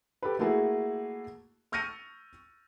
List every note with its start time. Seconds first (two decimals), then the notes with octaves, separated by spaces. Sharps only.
0.23 G4 A4 B4
0.39 A3 A#3 E4 F#4 G#4
1.72 C#6 F6 G6 A#6 C#7 D#7